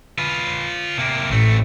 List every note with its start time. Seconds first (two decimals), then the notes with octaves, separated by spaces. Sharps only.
0.18 F4 B4
0.98 C3 A#3
1.31 A1 A3 C4